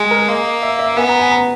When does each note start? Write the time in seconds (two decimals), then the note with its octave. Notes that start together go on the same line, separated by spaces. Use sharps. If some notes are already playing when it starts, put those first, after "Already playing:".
Already playing: G#3 G#4
0.11 A#4
0.28 A#3 D#5
0.62 E5
0.79 E5
0.96 B3 G#5
1.09 A#5
1.19 G#5
1.31 A#5